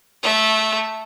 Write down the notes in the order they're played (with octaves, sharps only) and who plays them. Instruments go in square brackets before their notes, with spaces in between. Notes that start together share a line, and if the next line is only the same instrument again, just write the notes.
[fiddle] A3 E5